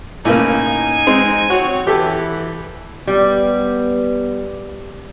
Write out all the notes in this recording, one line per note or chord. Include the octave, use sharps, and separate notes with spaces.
A2 C#3 A#3 D#4 G#5
G#3 C4
C4 F#4 C#5
E3 G4 A4
G3 B3